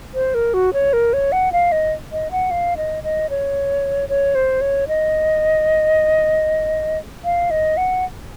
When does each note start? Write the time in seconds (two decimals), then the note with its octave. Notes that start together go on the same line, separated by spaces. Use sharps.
0.14 C5
0.34 A#4
0.54 F#4
0.73 C#5
0.93 A#4
1.13 C#5
1.32 F#5
1.52 F5
1.72 D#5
2.12 D#5
2.31 F#5
2.51 F5
2.77 D#5
3.04 D#5
3.30 C#5
4.09 C#5
4.35 C5
4.61 C#5
4.88 D#5
7.24 F5
7.51 D#5
7.77 F#5